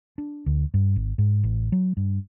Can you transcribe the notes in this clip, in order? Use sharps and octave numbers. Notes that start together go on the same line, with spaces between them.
D4
D2
G2
G#1
G#2
A1
F#3
G2